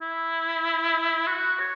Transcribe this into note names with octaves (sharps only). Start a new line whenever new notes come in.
E4
F#4
C#5